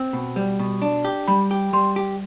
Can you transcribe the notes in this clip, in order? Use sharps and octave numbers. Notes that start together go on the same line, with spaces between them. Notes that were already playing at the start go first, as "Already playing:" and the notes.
Already playing: C4
B2
G3
B2
D4
G4
G3 B5
G4
G3 C6
G4